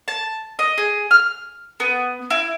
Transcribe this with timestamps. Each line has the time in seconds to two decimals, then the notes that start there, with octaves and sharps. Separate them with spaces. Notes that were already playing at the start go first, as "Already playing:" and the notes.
0.08 A5
0.59 D#5
0.78 G#4
1.11 F6
1.80 B3
2.30 E4